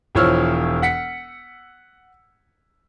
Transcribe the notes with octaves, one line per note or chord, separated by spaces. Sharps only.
E1 E3 F3 C#5 E6 F6
F#5 B6 C#7